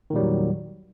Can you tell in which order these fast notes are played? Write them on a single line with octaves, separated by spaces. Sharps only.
D#3 A#2 G3 F#3 E2